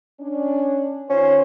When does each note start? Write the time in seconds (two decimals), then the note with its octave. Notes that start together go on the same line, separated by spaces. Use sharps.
0.20 C#4 D4
1.09 D#3 C#4 F4 C5